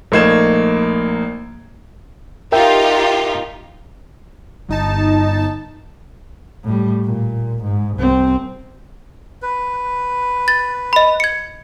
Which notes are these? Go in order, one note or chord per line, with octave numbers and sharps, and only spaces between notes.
A#1 A3 A#3 D#4 G#6 E7
D#4 F4 G4 A#4 E5 G5
G1 D#4 A5
A2 G3
A#2
G#2
C2 C4
B4
A6
D#5 B5
G#6 C#7